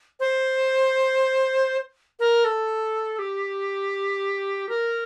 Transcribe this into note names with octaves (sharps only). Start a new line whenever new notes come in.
C5
A#4
A4
G4
A#4